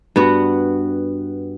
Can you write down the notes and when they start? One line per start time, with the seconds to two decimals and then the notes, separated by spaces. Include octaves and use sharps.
0.16 G2 B3 F#4